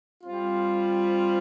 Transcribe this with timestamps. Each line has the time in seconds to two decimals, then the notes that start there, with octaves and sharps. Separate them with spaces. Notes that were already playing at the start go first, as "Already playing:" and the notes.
0.24 G3 C4 F4